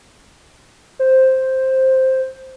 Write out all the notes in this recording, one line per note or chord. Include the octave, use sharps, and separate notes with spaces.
C5